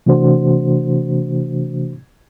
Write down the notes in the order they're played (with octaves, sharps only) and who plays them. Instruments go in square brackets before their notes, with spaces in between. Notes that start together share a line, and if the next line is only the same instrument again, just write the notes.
[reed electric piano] C3 E3 A3 D4 F#4 C5